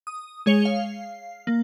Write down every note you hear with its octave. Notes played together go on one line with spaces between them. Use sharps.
D#6
G#3 G#4 C#5 C#7 F7 G7
F5
A#3